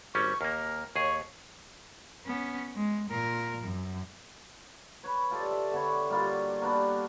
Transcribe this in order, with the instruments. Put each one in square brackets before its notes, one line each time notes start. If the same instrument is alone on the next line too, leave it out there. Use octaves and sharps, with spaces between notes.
[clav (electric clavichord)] G#1 G3 C#4 [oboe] C#6
[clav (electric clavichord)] D#2 A#3 [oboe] A#4
[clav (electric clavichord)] D#2 G#4 [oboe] C#5
[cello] B3 C#4
G#3
A#2 A#4
F#2
[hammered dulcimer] B4 C#5
F4 G4 A4 D5
E5
D3 B3 C#5
G3 A#3 F4 F#4
A#3 B3 D4 G4